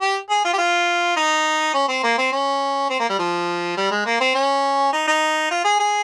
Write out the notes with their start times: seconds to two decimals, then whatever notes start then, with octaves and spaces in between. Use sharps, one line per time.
0.01 G4
0.30 G#4
0.45 F4
0.53 G4
0.58 F4
1.17 D#4
1.74 C#4
1.88 C4
2.03 A#3
2.18 C4
2.32 C#4
2.90 C4
3.00 A#3
3.09 G3
3.19 F3
3.77 G3
3.91 G#3
4.06 A#3
4.20 C4
4.35 C#4
4.93 D#4
5.07 D#4
5.51 F4
5.64 G#4
5.80 G#4